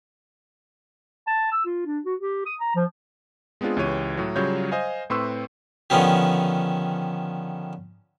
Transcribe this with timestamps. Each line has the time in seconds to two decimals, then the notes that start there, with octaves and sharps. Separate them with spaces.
1.27 A5
1.52 E6
1.66 F4
1.86 D4
2.05 F#4
2.20 G4
2.46 D#6
2.60 A#5
2.75 F3
3.61 G#3 B3 C4 D4 F4 G#4
3.77 C#2 E3 G4 C#5 D#7
4.17 A2 F#3
4.36 C#3 F#3 G3 F4 C#5 G6
4.72 C5 D#5 F5 G#5
5.10 A2 C4 B4 C6 C#6 E6
5.90 D3 D#3 F3 B3 C#4 G4